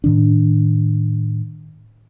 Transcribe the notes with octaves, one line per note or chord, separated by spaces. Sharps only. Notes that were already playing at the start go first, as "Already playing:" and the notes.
A2 D#3 D4